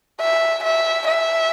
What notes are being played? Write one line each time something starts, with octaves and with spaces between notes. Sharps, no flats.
E5
E5
E5